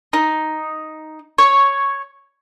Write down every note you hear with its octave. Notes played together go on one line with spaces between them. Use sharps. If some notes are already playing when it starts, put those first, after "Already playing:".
D#4
C#5